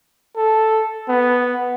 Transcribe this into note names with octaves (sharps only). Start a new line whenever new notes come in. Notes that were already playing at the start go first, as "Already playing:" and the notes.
A4
B3